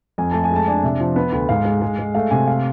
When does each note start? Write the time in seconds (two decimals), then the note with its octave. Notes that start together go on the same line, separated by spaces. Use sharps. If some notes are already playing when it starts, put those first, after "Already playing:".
0.18 F2 G#5
0.31 A3 A5
0.44 G#5
0.50 G#3
0.56 A5
0.68 D4 G#5
0.83 C3 E5
1.00 F3
1.16 B3
1.32 D2
1.49 G#2 F5
1.65 G#3
1.82 G#3
1.99 G#3
2.15 A3 F5
2.30 C3 G#5
2.47 F5